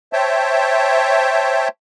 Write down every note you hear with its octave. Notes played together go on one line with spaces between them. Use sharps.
C5 C#5 E5 G5 A5